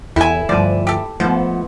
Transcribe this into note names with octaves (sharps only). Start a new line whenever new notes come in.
E2 E4 G4 A4 G#5
D2 G2 F3 D5 G#5
G4 A4
G#2 F3 A3 B3